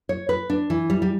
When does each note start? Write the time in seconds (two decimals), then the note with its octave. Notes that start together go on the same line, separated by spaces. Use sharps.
0.09 C#5
0.29 B4
0.50 D4
0.70 E3
0.90 G3
1.02 G3